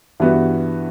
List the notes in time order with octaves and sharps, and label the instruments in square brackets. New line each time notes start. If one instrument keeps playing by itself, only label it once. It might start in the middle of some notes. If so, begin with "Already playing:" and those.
[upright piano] G2 E3 B3 F#4